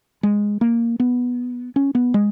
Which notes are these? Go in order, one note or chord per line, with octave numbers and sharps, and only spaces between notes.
G#3
A#3
B3
C#4
B3
G#3